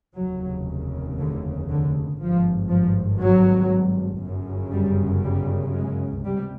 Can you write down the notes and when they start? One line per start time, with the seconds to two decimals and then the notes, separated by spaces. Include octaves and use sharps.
0.16 F1 D#2 C#3 F#3
1.18 D3
1.68 D3
2.19 G#1 G2 F3
2.70 F3
3.20 F#3
4.22 G1 F#2 C#3
4.72 G3
5.23 G3
5.73 G#3
6.24 C#2 C3 G3